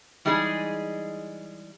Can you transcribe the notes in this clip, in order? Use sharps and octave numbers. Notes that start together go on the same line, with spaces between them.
E3 G3 G#3 D#4 G#4